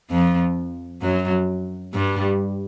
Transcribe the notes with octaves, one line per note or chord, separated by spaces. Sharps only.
F2 F3
F#2 F#3
G2 G3